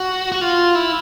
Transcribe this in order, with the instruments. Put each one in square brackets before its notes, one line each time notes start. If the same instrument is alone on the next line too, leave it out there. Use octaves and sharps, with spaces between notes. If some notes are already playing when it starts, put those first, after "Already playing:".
Already playing: [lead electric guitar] F#4
F#4
F4
E4